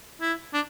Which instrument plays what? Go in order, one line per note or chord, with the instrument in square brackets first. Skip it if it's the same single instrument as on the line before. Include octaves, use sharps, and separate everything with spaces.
[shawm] E4
D4